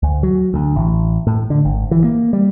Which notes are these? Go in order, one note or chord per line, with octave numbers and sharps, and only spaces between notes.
D2
F#3
D2
A1
A2
D3
G#1
E3
A#3
G3